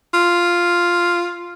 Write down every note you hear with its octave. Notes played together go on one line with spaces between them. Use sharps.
F4